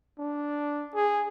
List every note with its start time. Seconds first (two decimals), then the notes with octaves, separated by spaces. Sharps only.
0.19 D4
0.94 G#4